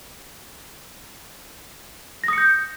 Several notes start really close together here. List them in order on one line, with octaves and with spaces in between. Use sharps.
A#6 D#6 C#7 G6